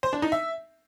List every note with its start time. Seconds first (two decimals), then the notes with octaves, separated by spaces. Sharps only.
0.03 C5
0.13 D4
0.22 D#4
0.32 E5